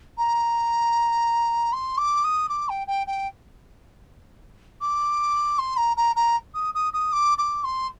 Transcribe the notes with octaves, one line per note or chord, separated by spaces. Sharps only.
A#5
C6
D6
D#6
D6
G5
G5
G5
D6
C6
A#5
A#5
A#5
D#6
D#6
D#6
D6
D6
C6